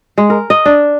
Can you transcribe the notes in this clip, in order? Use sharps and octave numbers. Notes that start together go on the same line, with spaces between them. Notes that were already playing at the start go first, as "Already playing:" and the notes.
G#3
A#4
D#5
D4